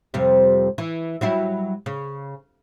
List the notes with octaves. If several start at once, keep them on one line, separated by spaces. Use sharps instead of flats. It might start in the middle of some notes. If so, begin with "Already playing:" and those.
F2 C3 G3
E3
F#3 G3 E4
C#3